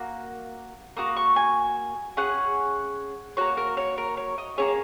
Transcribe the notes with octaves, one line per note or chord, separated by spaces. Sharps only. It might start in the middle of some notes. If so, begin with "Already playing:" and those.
Already playing: A#3 F#4
A#3 F#4 D#6
C#6
G#5
C#4 G#4 F#5
A#3 F#4 C#5
A#4
C#5
A#4
C#5
D#5
A#3 C#4 G#4 C#5